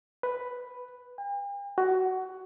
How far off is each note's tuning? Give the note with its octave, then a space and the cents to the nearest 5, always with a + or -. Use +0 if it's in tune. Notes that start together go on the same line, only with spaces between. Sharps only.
B4 +5
G5 +45
F#4 +15